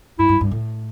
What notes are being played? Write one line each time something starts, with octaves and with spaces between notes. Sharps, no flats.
G2 E4
G2
G2
A2